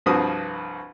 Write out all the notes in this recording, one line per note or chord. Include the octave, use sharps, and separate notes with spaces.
C2 G2 F3 F#4 B4 D#6